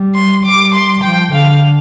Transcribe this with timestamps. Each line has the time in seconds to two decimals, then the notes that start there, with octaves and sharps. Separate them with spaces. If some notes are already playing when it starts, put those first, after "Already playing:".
Already playing: G3
0.15 C6
0.44 G3 D6
0.74 C6
1.03 F3 G5
1.33 D3 F5